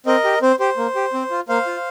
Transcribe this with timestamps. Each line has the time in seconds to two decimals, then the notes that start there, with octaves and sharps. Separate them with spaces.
0.06 C4 A#4 D#5
0.24 G4
0.42 C4 C5
0.59 G4 C5
0.77 A#3
0.96 G4
1.13 C4
1.31 F4
1.49 A#3 C5 F5
1.67 F4